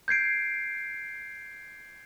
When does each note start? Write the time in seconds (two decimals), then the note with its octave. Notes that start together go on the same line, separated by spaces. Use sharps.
0.08 G6 G#6 C7 D7